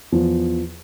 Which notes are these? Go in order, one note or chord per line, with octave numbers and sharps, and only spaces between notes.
E2 F3